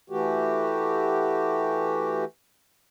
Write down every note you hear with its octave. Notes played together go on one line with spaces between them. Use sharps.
E3 A3 F#4 G4